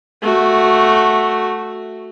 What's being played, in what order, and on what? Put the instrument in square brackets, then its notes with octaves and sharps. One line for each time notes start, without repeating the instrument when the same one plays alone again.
[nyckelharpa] A3 F#4